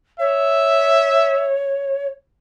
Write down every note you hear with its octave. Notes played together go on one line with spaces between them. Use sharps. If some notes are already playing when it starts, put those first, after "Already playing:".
C#5 E5